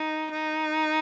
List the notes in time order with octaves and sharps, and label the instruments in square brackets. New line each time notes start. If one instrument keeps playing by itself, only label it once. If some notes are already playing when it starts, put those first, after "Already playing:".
Already playing: [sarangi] D#4
D#4